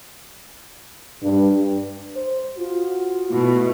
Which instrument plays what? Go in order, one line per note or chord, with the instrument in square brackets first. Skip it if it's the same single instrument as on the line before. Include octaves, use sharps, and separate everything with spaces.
[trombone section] G2
[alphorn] C5
[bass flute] F4 [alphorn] F#4
[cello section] B2 A3 [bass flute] E4